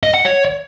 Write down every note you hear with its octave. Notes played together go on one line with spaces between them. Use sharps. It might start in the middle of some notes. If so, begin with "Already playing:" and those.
D#5
F#5
C#5